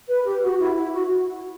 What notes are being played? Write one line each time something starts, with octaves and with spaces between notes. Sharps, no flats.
B4
G4
F#4
E4
E4
F#4